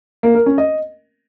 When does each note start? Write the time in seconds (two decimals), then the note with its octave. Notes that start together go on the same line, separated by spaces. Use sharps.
0.23 A#3
0.35 A#4
0.46 C#4
0.58 D#5